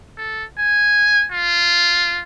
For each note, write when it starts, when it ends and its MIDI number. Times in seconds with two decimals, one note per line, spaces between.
0.18 0.44 69
0.59 1.26 80
1.32 2.22 65